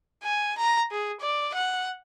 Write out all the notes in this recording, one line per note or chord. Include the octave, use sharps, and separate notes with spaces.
G#5
A#5
G#4
D5
F#5